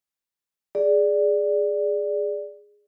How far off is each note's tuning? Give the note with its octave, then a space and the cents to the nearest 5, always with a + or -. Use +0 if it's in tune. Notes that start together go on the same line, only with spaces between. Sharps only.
G#4 +0 D5 +0